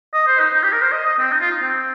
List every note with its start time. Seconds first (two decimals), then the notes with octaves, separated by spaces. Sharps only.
0.14 D#5
0.27 C5
0.39 D#4
0.53 D#4
0.63 G4
0.73 A#4
0.82 C5
0.92 D#5
1.05 D#5
1.19 C4
1.31 D#4
1.41 F4
1.51 D#4
1.62 C4